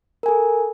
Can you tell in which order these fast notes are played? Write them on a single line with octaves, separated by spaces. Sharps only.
A#4 G#5 A4